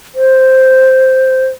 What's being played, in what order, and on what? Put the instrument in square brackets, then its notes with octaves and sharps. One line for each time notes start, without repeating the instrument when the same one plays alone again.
[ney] C5